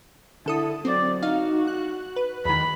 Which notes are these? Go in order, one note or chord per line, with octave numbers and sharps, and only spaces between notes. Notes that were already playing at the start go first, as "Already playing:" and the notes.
D3 E4 A4 D#6
F#3 C4 D5
D#4 F#4 F5
F#6
B4
E2 D#3 B5